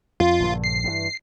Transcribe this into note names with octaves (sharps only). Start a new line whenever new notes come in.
F2 F4
A#1 G2 D3
C7
G2 D#3 E3